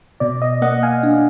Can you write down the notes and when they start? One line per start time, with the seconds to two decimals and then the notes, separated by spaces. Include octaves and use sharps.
0.20 B2 D5
0.42 D#5
0.62 A#3 D#5 F#5
0.83 F5 G#5
1.03 D4